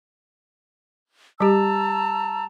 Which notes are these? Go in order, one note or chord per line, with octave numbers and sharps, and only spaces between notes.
G3 G4 A5 A#5 E6